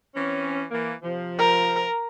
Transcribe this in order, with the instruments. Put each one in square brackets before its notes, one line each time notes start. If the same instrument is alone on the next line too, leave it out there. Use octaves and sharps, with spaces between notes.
[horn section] E3 C4 C#4
E3 A#3
C3 F3
[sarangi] A#4